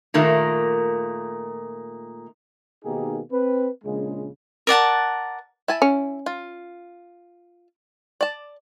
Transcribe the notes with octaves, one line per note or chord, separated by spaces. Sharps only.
A#2 D#3 A3 A#3
B2 D#3 A#3 D#4 G4 G#4
C4 B4
A#1 C#3 G#3
A#4 D5 F#5 A5
E4 G#5 A5
C#4
F4
D5 A5